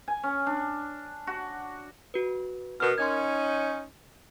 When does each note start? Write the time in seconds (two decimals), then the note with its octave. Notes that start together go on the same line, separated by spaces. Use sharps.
0.08 G#5
0.23 C#4
0.46 D4
1.27 F#4
2.14 F#4 B4
2.80 B2 A#4 F6
2.98 C#4 D#4 C6 G#6